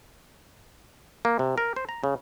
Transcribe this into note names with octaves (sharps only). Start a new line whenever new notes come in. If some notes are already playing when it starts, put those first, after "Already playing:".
A#3
C3
A#4
C5
A#5
C#3